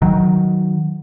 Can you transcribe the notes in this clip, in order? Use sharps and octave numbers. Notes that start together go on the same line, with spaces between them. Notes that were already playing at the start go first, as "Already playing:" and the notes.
D#3 F#3